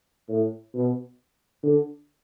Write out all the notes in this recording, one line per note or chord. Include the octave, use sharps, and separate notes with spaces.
A2
B2
D3